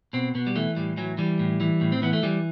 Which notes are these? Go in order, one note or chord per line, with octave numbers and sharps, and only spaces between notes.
B2 C4
B2 B3
G3
E3 A3
A2 G3
E3 F#3
E3 G3
A2
E3
A2
C4
E3 B3
A3
E3 G3